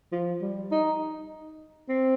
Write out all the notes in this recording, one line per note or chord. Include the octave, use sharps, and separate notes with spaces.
F3
G3
D#4
C4